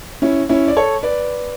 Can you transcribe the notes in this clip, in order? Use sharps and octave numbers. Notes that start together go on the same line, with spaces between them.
C#4 E4
C#4 E4
D5
A4 C#5
B4 D5